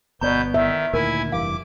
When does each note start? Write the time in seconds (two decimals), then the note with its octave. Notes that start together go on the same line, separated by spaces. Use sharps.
0.21 G1 B2 B3 D5 A#5 G6
0.54 D#3 E5
0.93 D2 A#2 D#3 E4 A#4 G#5
1.32 F1 G2 E3 F5 D6